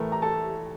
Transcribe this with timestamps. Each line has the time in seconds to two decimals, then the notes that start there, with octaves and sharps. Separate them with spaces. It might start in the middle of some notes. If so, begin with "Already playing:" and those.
Already playing: A2 E3 A3 A#4
0.12 A#5
0.22 A4 A5